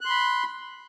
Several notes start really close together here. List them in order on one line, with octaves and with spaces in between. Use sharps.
F#6 C6 B5